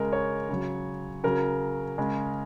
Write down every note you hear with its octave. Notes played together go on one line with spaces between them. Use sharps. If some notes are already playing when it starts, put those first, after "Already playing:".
Already playing: C#3 G#3 A#4
C#5
C#3 F#3
C#3 F#3 A#4
C#3 G#3